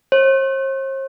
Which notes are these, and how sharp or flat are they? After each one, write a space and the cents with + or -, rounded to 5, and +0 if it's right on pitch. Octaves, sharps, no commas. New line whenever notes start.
C5 +45